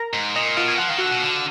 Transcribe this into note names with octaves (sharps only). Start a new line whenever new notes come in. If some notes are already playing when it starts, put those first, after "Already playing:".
Already playing: A#4 A#5
G#2
A#2 D#5
D#5
B2 F4 F5
G#5
F3 F#5
D#3 F5
D3 F#4 F#5
B2
D3